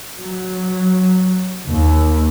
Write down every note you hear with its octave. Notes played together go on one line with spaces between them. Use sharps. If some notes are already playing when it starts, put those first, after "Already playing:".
F#3
D#2